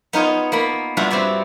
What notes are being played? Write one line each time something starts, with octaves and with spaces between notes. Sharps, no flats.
B3 D#4 F4 C#5
A#3 B3 B5
G2 B3 D4 F4 F#4 E5
B3 C4 C#5 D5 B5